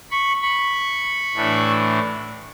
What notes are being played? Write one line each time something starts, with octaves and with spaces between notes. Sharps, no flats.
B5 C#6
B5 C#6
A2 E3 A3 D4